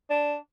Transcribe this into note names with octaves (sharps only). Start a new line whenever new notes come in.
D4